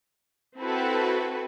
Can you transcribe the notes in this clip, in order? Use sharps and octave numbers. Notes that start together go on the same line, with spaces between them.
C4 E4 F#4 A4 B4